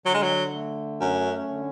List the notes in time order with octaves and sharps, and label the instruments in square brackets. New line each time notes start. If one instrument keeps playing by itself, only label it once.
[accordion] D3 [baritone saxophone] F#3
[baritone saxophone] G#3
F#3
[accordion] A3
[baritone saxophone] F#2 [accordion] C#4
[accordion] D3